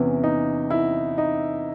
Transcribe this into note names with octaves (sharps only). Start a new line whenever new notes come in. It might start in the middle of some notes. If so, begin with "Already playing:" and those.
Already playing: E2 C3 E3 C#4
D#4
E4
D#4